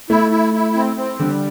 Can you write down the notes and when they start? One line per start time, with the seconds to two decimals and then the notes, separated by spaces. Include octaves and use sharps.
0.10 A3 E4
0.31 E4
0.54 E4
0.75 C4
0.96 C4
1.19 D3 G3